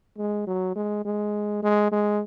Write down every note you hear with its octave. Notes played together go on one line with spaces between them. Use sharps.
G#3
F#3
G#3
G#3
G#3
G#3